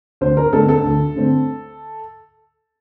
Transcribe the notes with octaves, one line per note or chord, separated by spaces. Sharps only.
D2 C5
A#4
D3 A3 C4 A4
A4
D2
D3 A3 C4